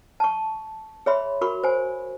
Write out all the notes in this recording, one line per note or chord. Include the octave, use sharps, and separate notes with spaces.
A5 C#6
G#4 C#5 E5 B5 C6
F#4 A#4 B5 C#6
C5 G#5